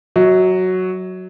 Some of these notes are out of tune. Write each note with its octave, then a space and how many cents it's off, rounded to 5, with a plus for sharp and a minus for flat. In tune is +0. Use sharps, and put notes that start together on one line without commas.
F#3 +0 D#5 +45